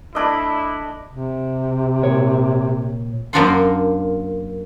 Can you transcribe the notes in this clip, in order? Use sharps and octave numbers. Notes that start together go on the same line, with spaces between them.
A3 D4 E4 D#5
C3
A#2 C#5
F#2 A#3 D4 F4 F#5 C6